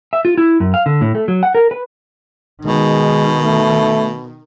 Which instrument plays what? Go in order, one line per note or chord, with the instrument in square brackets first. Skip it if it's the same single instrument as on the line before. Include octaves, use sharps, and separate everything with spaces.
[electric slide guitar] E5
F4
E4
F#2
F5
D3
A2
A3
F#3
F#5
A#4
B4
[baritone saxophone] B2 [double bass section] D#3 [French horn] G#3
[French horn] A3